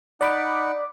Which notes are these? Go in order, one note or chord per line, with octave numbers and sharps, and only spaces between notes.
D#4 D5 F#5 B5 D6